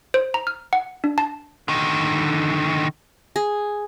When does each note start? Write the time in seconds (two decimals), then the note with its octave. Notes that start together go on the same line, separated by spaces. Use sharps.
0.14 C5
0.34 A#5
0.47 F6
0.73 F#5
1.04 D4
1.18 A5
1.68 D3 D#3
3.36 G#4